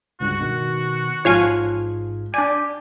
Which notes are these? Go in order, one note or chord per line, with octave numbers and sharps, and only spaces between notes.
C#2 G2 F#4
B2 D#3
A1 G#2 F3 C#5 F5 G#5
D4 G4 D5 G#5